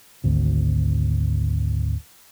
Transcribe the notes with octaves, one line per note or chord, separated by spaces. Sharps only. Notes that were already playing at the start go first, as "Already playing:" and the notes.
G#1 D2